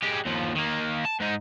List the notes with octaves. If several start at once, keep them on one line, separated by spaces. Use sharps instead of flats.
G#3 G4
D#2 F3
D#3 A#3
A5
G#2 D#4